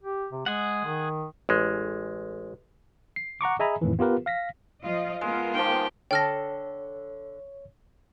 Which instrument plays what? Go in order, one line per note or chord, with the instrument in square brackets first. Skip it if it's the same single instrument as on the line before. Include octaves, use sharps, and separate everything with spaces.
[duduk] G4
C3
[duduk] G#3 [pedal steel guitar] G#4 F#5
[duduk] D#3
[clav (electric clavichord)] A1 G#3
[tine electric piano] C7
F#5 A#5 C#6 D6
G#4 D#5 E5 G#5 A#5 B5
F2 A2 D#3 E3
B3 F4 G4 A#4 B4
F5 A#6 B6
[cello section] F3 F4 D#5
[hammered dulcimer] G#3 [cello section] B3 F4 A#4
[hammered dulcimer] D#3 F3 [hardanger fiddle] G4 G5
[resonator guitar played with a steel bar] D3 A4 A5 [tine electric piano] C#5 [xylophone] G5 F6 A#6